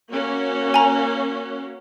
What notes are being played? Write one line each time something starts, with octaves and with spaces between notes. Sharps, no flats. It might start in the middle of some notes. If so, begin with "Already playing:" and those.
A#3 C#4 F#4
G#5 A#5